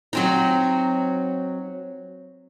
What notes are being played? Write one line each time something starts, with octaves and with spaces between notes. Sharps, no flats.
F#3 C4 D#4